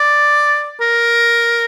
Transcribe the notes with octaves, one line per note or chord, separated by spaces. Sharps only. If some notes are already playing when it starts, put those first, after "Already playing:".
Already playing: D5
A#4